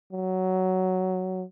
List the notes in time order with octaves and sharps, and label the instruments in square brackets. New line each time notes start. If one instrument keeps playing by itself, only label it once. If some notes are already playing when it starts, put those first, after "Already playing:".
[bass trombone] F#3